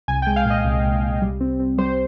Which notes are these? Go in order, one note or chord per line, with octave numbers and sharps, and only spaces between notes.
C2 G#5
G#3 G5
F5
A#2 D#5
C2
C2
C2
G3
C4
C4
G3 C5